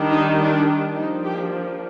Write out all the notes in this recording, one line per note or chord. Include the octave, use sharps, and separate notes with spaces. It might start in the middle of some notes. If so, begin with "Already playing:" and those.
Already playing: D#3 G3 D4
D#4
D4
F3 A#3 D4 D#4
G4